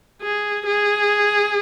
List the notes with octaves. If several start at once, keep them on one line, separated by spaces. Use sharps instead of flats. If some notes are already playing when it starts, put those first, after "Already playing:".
G#4
G#4